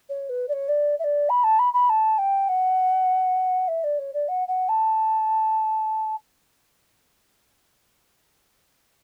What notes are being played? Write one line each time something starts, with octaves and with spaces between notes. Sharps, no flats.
C#5
B4
D5
C#5
D5
E5
D5
B5
A5
B5
B5
A5
G5
F#5
E5
D5
C#5
D5
F#5
F#5
A5